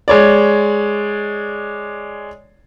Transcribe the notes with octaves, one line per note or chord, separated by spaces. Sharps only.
G#3 C#5 D5